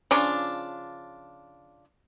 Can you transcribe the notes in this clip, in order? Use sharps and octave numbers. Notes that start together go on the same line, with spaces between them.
C#3 F3 D4 F4